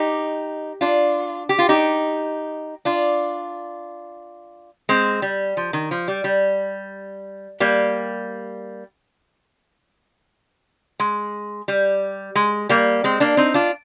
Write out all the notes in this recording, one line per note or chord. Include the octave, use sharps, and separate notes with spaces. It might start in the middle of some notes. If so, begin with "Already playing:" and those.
Already playing: D#4 G4
D4 F4
G4
F4
D#4 G4
D4 F4
G#3 C4
G3
F3
D#3
F3
G3
G3
G3 A#3
G#3
G3
G#3
G3 A#3
G#3 C4
A#3 D4
C4 D#4
D4 F4